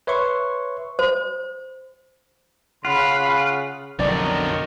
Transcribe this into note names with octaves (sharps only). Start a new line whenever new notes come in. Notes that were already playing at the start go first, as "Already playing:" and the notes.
B4 C#5 E5 C6 C#6
C5
C#3 F4 F5 F#5 B5
B1 F2 B2 D3 D#3 F#3 D5